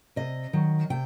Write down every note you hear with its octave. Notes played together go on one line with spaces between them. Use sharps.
C3 D#5
D#3 F#3
C3 G5